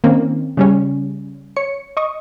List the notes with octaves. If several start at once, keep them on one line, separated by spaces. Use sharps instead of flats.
D#3 A#3 C4 C#4
C#3 G3 C#4
C#5 C#7
D#5 C#6 D#6